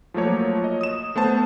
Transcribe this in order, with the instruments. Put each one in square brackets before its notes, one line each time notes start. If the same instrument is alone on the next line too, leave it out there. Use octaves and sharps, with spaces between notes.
[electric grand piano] F3 F#3 A3 A#3 C#5
D#5
D#6 E7
A3 B3 C5 A5